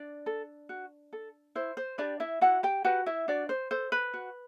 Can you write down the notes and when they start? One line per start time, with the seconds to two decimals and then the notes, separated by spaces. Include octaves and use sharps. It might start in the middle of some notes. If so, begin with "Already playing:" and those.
Already playing: D4 D5
0.26 A4
0.69 F#4
1.13 A4
1.55 E4 C5
1.77 C5
1.98 D4 G4 B4 D5
2.20 E4 E5
2.41 E4 F#4 F#5
2.63 G4 G5
2.85 F#4 G4 B4 F#5
3.06 E4 E5
3.28 D4 F#4 D5
3.49 C5
3.71 A4 C5
3.92 B4
4.14 F#4